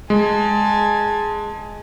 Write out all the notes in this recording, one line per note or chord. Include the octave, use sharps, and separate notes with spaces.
G#3 G#5 A5